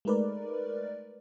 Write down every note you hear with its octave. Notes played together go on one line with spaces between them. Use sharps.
G#3 A3 D#4 A#4 B4 D5